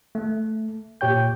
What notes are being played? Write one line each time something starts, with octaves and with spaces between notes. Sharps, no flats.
A3
A#2 G4 C#5 G5 G6